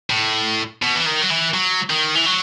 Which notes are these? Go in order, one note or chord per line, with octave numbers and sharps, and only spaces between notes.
A2
B2
E3
D#3
F#3
E3
F#3
D#3
E3
F#3